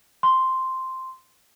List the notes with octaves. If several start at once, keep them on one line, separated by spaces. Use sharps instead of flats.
C6